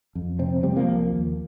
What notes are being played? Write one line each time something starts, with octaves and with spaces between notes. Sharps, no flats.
F2
C3 C4
C3 G3 C4
F3 A#3
C2
D#2